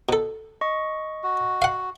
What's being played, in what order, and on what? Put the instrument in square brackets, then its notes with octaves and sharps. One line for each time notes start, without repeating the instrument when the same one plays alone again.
[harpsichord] B2 A4
[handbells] D#5 C#6
[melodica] F#4
[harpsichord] F5 F#5